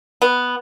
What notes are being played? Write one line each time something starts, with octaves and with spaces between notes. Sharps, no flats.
B3